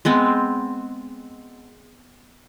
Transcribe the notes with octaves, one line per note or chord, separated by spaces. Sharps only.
G#3 B3 C4